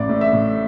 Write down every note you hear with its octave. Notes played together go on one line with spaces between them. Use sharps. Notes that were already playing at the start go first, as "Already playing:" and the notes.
Already playing: A1 D5
A2
E5
A2